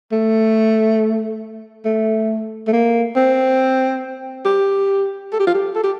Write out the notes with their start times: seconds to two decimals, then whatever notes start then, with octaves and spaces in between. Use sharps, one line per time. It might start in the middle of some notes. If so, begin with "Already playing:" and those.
0.12 A3
1.85 A3
2.68 A3
2.73 A#3
3.16 C4
4.45 G4
5.33 A4
5.40 G4
5.47 F4
5.55 G4
5.75 A4
5.84 G4